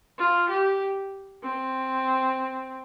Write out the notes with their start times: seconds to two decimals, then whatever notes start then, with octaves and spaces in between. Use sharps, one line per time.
0.19 F4
0.50 G4
1.43 C4